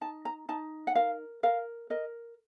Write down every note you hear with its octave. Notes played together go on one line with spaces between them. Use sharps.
D#4 A5
A#5
D#4 A5
F#5
A#4 F5
A#4 F5
A#4 D#5